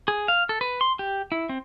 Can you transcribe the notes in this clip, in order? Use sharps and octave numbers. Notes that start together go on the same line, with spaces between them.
G#4
F5
A4
B4
C6
G4
E4
C4